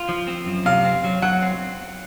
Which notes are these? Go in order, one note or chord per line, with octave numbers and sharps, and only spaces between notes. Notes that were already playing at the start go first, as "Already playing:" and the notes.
Already playing: F4
F3
C4
F#2
C3 F5
C4
F#3
F#3 F#5
C4